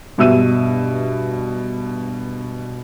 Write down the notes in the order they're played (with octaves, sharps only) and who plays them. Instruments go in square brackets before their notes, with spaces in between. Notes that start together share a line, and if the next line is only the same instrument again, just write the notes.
[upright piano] G2 B2 E5 E6 D#7